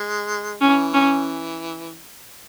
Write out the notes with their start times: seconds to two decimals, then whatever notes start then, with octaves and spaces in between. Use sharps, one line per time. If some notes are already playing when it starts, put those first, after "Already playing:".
Already playing: G#3
0.61 E3 C#4
0.94 C#4